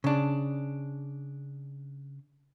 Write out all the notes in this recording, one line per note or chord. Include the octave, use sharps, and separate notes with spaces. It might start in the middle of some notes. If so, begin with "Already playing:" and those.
C#3 D4